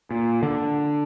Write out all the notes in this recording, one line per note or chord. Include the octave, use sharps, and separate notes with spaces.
A#2
D3